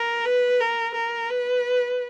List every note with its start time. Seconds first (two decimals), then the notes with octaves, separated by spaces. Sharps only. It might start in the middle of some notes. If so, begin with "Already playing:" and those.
Already playing: A#4
0.26 B4
0.60 A#4
0.95 A#4
1.30 B4